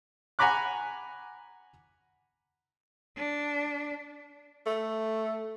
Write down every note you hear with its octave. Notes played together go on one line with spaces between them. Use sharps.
F#5 G#5 A#5 B5 D6 F#6
D4
A3